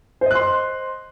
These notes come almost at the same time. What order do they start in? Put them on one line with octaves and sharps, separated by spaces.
C5 D#5 F#6 C6